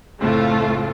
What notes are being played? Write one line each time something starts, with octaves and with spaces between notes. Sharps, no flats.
F#1 A2 A3 C4 F4